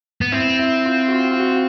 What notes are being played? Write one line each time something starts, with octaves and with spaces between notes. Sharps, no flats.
B3
C4 E4
E4
F4
F#4
F4
F4
F#4